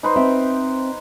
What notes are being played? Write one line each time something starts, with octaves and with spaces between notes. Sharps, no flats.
D#4 B4 C5
C4 E5